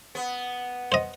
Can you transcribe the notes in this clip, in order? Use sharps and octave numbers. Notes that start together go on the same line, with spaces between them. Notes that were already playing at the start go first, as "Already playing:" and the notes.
B3
C5 D#5